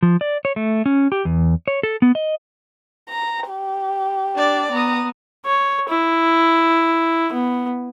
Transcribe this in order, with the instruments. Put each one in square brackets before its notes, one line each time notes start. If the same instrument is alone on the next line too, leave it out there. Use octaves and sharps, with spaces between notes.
[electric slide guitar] F3
D5
C#5
A3
C#4
G4
E2
C#5
A4
B3
D#5
[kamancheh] A#5
G4
[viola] D4 D5
[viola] B3 [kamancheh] A#5 D#6
[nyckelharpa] C#5
E4
B3